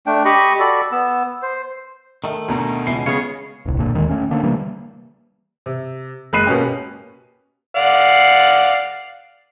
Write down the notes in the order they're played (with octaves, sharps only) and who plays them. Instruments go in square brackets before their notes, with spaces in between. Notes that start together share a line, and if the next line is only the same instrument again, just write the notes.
[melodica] A3 D4 G5
G4 D#5 B5 C#6
F#4 A4 D5 B5
B3 E6
C5
[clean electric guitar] D#3 A3
[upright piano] D2 B2 A#5
[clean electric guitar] C#2 B2 E3 [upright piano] C7
[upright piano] C#3 G#3 B3 [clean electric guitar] G#4 C#5
[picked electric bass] D#1 C2
F#1 A#2 D3
D#2 D#3 F#3 G#3
A3 C#4
D3 A#3 D4
C3 E3 G3 A#3
[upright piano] C3
F#1 G#3 B5 F#6 C7 D#7
B2 A#3 B3 C#4 G4
[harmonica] D5 F5 F#5